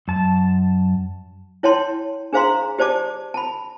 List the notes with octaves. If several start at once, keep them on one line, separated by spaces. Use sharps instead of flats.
F#2 A5
E4 C#5 G5 A5 C6
D4 G#4 C5 F5 A#5 C6
G4 C5 D5 A5 D6
A5 B5